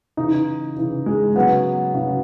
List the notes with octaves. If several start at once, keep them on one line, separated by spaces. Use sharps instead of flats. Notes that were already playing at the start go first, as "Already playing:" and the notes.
C#3 E3 D#4
C#3 E3
G#3
C#3 F#3 B3
C#3 F#3